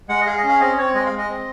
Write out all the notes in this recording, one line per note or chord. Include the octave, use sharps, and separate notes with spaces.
G#3 F#5
D#5
G#4 F5
D#5
C#4
F5
C4 D#5
C4 C#5
G#3 D#5
F5
G#3
D#5
C4